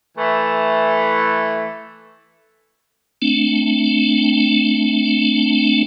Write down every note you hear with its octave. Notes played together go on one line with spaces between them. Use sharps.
E3 A3
A3 C4 D4